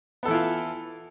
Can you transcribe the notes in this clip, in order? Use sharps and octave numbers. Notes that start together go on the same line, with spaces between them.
E3 B3 E4 F4 A4